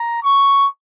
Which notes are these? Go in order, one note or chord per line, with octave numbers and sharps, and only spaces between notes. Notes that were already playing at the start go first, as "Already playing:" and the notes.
Already playing: A#5
C#6